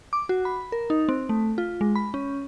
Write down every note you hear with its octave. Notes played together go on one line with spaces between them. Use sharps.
D6
F#4
B5
A#4
D#4
C4
A3
F4
G#3
B5
C#4